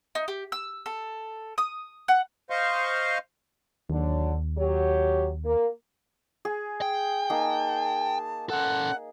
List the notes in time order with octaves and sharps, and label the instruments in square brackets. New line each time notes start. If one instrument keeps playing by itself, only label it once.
[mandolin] D#4
G4
E6
A4
D#6
F#5
[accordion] C5 D#5 F5 C6 C#6
[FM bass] D#2 [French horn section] D3 F#3 D4
[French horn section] F#3 G4 C#5
A#3
[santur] G#4
[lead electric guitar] G5
[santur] A#3 D#4 G#4 [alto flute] A5
[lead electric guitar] C#4 A4 [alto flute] F#5